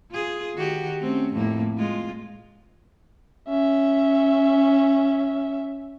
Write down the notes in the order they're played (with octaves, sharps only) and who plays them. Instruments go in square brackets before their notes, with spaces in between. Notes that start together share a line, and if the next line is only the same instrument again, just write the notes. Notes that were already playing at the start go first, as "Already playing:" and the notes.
[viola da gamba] F4 G#4
D#3 F#4 G4
A3 C4 C#4
F2 A2 A#3
G#3 F4
[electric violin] C#4 E5